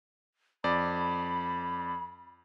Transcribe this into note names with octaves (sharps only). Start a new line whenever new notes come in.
F2 D5 B5